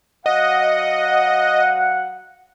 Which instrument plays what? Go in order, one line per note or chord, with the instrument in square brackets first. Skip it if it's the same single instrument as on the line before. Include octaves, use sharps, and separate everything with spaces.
[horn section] F#3 F5 F#5 [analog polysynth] D#5